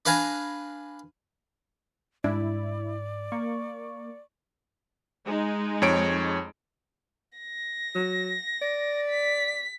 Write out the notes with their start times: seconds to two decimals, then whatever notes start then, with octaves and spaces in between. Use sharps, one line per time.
0.06 D4 B4 F5 G#5 A#5
2.24 G#2 D4 E4 D5
3.32 A#3 C#6
5.25 G#3 D#4
5.82 F2 C#5 D7
7.38 A#6
7.95 F#3
8.61 D5
9.08 B6